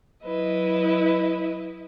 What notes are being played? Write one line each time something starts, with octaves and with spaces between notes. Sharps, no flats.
F#3 E4 B4 D#5